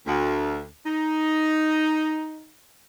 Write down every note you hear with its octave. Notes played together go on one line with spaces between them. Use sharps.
D2
D#4